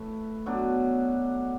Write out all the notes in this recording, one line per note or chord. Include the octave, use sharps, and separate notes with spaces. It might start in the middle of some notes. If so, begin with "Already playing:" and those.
Already playing: A2 A3 B4 A5
B2 F#3 D4